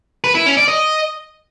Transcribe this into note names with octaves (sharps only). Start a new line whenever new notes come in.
B4
E4
C#4
D5
D#5